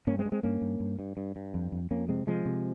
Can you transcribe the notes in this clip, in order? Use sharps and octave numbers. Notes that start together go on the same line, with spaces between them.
G2 A#3 C#4
G#3 C4
G2
G#3 C4
G2 A#3 C#4
G2
G2
G2
G2
G2
F2
F2
F2 A#3 C#4
C3 G#3 C4
C3 F3 G#3
C3